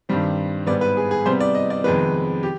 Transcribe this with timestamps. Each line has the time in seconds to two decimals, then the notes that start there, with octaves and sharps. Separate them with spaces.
0.09 G2 D#3 G3 C4
0.67 G#2 G3 B3 D5
0.81 B4
0.97 G#4
1.11 G#4
1.26 C3 G3 B3 C5
1.40 D5
1.55 D#5
1.70 D5
1.84 F2 C3 D#3 G#3 B3 B4
2.43 G4